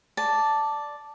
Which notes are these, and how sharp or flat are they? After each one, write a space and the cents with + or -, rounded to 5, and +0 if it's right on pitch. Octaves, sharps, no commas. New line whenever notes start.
D5 +0 A5 +0